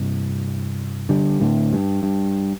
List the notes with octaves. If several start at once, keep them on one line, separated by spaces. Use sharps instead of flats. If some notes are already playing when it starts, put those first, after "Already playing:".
Already playing: G2 C3
D3 G3
A2 D3
G2
G2